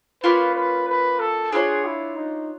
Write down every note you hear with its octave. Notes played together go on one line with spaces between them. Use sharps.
A#3 C#4 F4 B4
B4
B4
A4
D4 F4 G#4 A#4 C#5
E4
D#4